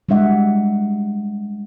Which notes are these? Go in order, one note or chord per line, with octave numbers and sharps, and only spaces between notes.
G3 G#3 D4 E5 F#5